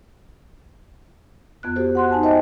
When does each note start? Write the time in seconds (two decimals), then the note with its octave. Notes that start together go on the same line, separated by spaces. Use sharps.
1.63 F2 B3 F#6
1.76 F#4 G4 A4 C5
1.95 F#5 C6 F#6
2.11 D#4 G#5 A5
2.23 A#4 C5 D#5 E5 G5 A5